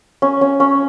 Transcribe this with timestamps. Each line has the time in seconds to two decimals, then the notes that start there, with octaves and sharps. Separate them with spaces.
0.22 C#4
0.41 C#4
0.60 C#4